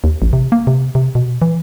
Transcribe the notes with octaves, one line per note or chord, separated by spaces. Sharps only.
D#2
A1
C3
A#3
C3
C3
B2
E3